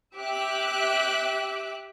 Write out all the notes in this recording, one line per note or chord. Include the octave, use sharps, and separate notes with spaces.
G4 E5 D6 E6 F#6